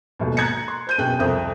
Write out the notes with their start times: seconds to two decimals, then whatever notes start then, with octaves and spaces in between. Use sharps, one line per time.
0.20 D#1 G#1 B2
0.37 A#5 F#6 G#6 A6 C#7
0.68 C6
0.87 C5 G6 D#7
0.98 F#2 B2 G#4 G5 F#6
1.19 C2 F2 C4 D#6